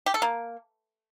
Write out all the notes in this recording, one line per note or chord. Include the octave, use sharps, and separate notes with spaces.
G4
A4
A#3